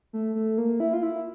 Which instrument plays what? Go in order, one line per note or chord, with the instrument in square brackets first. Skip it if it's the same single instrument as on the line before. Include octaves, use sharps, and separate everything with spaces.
[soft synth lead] A3
A3
A#3
E4
F4
E4